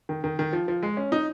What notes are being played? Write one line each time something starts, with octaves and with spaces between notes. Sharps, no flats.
D#3
D#3
D#3
F3
F3
G#3
C#4
D#4